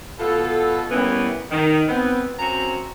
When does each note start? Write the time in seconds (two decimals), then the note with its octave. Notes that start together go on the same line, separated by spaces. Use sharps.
0.19 B2 F4 A4
0.90 E3 G3 A#3 B3 C#4 E4
1.50 D#3
1.88 B3 C4
2.38 F#2 C4 F#4 A#5